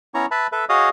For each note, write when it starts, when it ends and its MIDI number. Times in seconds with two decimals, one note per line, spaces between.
0.14 0.26 59
0.14 0.26 61
0.14 0.26 64
0.14 0.26 73
0.14 0.26 82
0.14 0.26 85
0.31 0.47 71
0.31 0.47 76
0.31 0.47 81
0.31 0.47 83
0.52 0.65 69
0.52 0.65 71
0.52 0.65 76
0.69 0.89 66
0.69 0.89 68
0.69 0.89 73
0.69 0.89 75
0.69 0.89 77
0.69 0.89 87